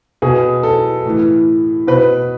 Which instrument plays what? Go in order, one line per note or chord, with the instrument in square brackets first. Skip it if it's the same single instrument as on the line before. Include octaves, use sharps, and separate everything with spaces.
[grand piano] B2 G#4
A4
A2 E3
B2 B4